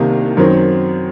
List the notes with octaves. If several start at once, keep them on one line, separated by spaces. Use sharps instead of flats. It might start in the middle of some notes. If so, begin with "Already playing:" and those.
Already playing: C2 C3 D#3 A#3 D#4
F#2 D#3 F#3 C4